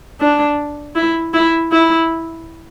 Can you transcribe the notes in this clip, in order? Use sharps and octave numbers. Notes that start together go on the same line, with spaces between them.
D4
E4
E4
E4